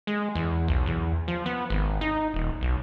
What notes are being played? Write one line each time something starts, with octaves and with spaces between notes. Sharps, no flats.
G#3
E2
B1
E2
F3
B3
G#1
D#4
D#1
B1